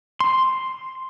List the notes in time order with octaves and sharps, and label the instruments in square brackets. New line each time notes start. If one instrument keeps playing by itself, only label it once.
[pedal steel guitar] C6